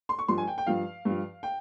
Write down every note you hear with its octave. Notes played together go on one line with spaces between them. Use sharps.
C6
C#6
G2 F3 C6
G#5
G5
G5
G2 F3 F5
G2 F3
G5